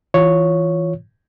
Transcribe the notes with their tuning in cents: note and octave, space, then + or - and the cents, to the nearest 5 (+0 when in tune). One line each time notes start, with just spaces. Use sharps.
E3 -5 F4 +0 C#5 +0